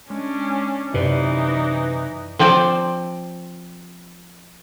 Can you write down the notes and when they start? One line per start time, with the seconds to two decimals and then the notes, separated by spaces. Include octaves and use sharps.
0.10 G#3 C#4 D4
0.94 F#2 C3 E3 D#4 B4 D5
2.39 F3 C4 C5 D5